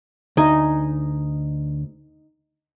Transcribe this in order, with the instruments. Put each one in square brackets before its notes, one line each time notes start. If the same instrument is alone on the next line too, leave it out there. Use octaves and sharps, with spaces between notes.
[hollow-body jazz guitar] D2 [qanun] D#4 G#5